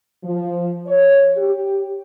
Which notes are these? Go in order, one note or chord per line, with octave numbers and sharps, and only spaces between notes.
F3
C#5
G4